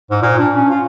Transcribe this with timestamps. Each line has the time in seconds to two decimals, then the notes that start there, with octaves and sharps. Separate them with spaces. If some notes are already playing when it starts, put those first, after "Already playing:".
0.10 G#2
0.22 A#2
0.39 D4
0.53 C#4
0.70 F4